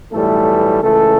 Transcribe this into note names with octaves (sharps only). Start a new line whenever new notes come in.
B1 A2 E3 G3 A3 A4
C#2 C#3 E3 A3 A4